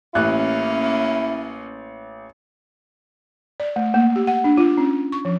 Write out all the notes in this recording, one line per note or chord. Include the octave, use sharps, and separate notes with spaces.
A1 A#3 C#4 E4 F#6
D5
A3
A#3
G4
F#5
D4
F4
C#4
C#6
F3